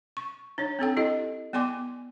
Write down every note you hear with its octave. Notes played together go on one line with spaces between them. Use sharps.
C#6
D4 D#4 C#5
C4 D4 A4 G5
E4 G4 A4 D#5
B3 D5 G5 G#5 C6 D6